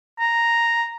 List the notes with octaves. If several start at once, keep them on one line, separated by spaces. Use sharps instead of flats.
A#5